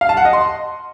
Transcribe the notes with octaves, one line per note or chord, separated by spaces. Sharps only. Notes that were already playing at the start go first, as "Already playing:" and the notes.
F5
A5
F#5
D#5
C6